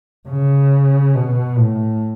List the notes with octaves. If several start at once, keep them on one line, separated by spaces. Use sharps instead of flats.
C#3
B2
A2